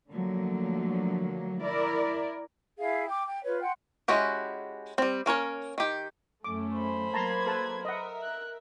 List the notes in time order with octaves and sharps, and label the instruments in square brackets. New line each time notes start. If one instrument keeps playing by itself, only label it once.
[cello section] D3 F3 F#3 A3 A#3
E4 A#4 D5
[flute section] E4 G#4 E5 F5
G5 D6
G5
F4 B4 C#5
F#5 G5 C6
[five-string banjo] G#3 C#4 E4 F#4 G4
G3 C4
A#3 C#4 A#4 C#5
D#3 G4
[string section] F#2 A3 C#4 [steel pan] D6
[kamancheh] C5 B5
[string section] F#3 A#3 G#6 [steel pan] A5 A#5 C6
[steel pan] A4 B4 A5
[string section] A#4 E5 [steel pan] D#5 F#5
[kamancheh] F#6